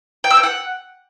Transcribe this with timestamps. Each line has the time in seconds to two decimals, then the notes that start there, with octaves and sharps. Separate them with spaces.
0.24 G5
0.30 E6
0.37 G5
0.43 F#5